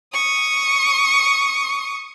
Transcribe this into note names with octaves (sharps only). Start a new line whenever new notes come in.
C#6 D#6